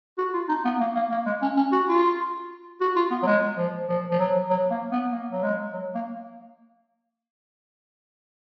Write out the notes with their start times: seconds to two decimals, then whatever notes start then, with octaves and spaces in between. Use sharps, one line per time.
0.18 F#4
0.33 F4
0.49 D#4
0.65 B3
0.80 A#3
0.95 A#3
1.11 A#3
1.26 G#3
1.42 C#4
1.57 C#4
1.72 F#4
1.88 F4
2.81 F#4
2.96 F4
3.11 B3
3.23 F#3
3.26 G#3
3.57 F3
3.88 F3
4.11 F3
4.19 F#3
4.50 F#3
4.71 A#3
4.92 B3
5.12 A#3
5.32 F#3
5.43 G#3
5.73 F#3
5.95 A#3